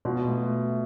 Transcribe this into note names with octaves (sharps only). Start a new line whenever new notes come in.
B2 F4
A3